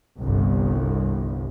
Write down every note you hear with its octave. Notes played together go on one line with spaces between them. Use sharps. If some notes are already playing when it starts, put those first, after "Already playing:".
G1 C2